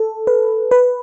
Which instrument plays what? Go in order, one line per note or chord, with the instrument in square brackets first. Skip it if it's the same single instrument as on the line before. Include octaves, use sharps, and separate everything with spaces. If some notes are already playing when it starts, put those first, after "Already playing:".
Already playing: [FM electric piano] A4
B4
B4